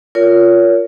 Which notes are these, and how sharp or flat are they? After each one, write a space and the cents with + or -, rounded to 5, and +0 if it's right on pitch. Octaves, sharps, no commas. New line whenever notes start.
F4 +0 A#4 +0 C#5 +30